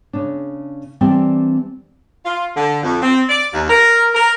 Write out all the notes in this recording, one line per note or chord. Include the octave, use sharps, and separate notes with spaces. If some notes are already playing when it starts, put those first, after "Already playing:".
C#3 D4
E3 G3 C4 D4 D5
F4
D3
F2
C4
D5
D#2
A#4
A#4